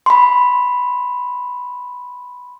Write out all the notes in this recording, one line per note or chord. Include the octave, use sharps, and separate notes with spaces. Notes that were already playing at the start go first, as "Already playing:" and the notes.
B5 C6